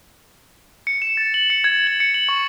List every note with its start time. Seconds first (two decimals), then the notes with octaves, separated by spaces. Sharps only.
0.87 C#7
1.02 E7
1.17 A6
1.34 F#7
1.50 C#7
1.64 G#6
1.87 F#7
2.00 C#7
2.14 F#7
2.29 C#6